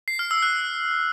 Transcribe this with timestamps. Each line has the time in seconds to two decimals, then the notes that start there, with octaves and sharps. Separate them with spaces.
0.08 C7
0.19 F6
0.31 E6
0.42 F#6